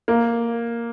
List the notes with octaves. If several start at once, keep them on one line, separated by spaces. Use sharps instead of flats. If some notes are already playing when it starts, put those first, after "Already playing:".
A#3